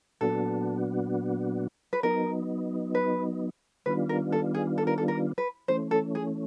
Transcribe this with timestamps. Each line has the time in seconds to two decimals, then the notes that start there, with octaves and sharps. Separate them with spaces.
0.21 A#2 F#3 B3 D4 F#4 A4
1.93 B4
2.03 F#3 B3 D#4 A#4
2.95 B4
3.86 D#3 G3 B3 D4 F4 B4
4.09 A#4
4.32 A4
4.54 G#4
4.78 A4
4.87 A#4
4.98 A4
5.08 A#4
5.38 B4
5.68 E3 A3 C#4 C5
5.91 A4
6.15 G#4